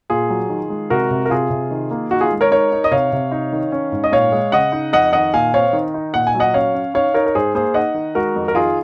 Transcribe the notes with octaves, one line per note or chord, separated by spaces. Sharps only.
A#2 F4 G#4
F#3
D#3
G#3
C3 F#4 A#4
C3
A#4
C3 F4 G#4
C3
D#3
A#3
D#3 F#4
F4 G#4
G#3
A#4 C#5
D#4 A#4 C#5
D#4
D#5
C3 C#5 F5
C3
D#4
D#3
C#4
G#2
D#5
A#2 C#5 F5
G#3
C#3 D#5 F#5
D#4
F2 D#5 F#5
D#3 D#5 F#5
A#2 F5 G#5
C4 C#5 F5
D#3
D#4
A#2 F#5
G#5
F#3
D#5 F#5
C#4 C#5 F5
C#4
D#4 C#5 F5
D#4 A#4 C#5
A#4
G#2 G#4 C5
A#3 G#4 C5
D#4 D#5 F#5
D#3
G#3 F#4 A#4
F2
A#4
D#3 F4 G#4